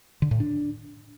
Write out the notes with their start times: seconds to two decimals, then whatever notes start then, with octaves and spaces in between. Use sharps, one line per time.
0.22 D3
0.31 A2
0.40 D4